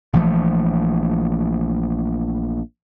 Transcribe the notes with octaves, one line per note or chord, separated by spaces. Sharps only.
A#1 E3 F3 A3